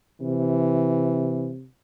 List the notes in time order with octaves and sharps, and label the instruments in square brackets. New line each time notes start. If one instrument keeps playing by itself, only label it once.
[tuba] C3 [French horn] E3